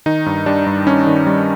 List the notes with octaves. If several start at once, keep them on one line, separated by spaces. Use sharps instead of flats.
D#3 D#4
G2
G3 D4
G2
G2 C#4
D#3
G3